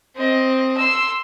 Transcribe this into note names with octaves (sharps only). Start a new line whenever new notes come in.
C4 D#5
C6 E6